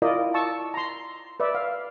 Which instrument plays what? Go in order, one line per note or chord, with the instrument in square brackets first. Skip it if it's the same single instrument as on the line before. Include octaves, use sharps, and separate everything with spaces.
[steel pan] E4 F4 A#4 D5 D#5
A5 C#6 E6
A#5 C6
B4 D5 E5
F5